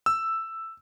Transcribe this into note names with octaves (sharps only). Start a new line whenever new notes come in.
E6